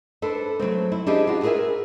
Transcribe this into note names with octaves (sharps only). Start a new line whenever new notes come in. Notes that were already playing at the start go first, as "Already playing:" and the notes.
D4 A4 B4 C5
F#3 G#3 A3 C4
E4
D4 E4 G4 G#4 D#5
F4 F#4
G#4 A#4 B4 D#5 E5 G#5